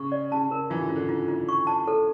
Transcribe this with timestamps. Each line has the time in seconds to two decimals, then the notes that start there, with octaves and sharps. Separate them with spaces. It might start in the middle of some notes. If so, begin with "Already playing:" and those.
Already playing: C#3 C#6
0.12 D5
0.31 C#3 A5
0.47 C#3
0.51 A#4
0.70 E3 F4
0.78 D3
0.87 C#3 F4
0.96 D3
1.09 F4
1.28 F4
1.49 C#6
1.67 A5
1.88 A4